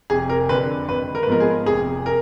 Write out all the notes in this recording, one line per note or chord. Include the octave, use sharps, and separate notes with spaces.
F1 G#4
A#4
F2 D3 B4
G#1 B4
A#4
B4
G#2 F3 B3 A#4
G#4
F1 G#4
A#4